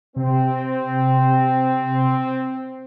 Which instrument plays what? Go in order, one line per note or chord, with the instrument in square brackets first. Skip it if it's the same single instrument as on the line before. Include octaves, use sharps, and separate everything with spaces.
[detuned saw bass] C3 [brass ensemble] C4